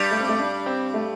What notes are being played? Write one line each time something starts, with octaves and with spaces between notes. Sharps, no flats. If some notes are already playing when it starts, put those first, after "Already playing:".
Already playing: G2 G3
A3
C4
A3
D4
C4
A3